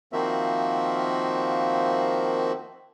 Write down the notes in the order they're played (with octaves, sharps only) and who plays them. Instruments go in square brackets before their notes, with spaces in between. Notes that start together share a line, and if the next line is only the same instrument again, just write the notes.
[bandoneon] D#3 F3 A#3 C4 F#4 E5